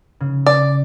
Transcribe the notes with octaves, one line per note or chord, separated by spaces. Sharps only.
C#3
D5